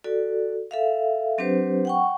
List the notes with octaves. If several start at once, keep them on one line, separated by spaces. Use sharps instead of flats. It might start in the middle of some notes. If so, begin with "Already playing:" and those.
F#4 A4 D5
A4 E5 F5
F#3 C4 D4 G4 B4 C5
F#5 G5 C#6